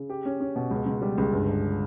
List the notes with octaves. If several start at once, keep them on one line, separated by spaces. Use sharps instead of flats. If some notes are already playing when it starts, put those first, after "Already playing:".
Already playing: C#3
G4
C#4
C#4
B2
C#2
C#2
G3
C#2
G1
G1